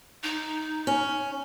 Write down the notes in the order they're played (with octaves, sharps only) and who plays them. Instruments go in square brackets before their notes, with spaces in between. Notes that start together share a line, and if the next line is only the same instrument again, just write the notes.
[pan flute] D#4
[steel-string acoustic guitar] C#4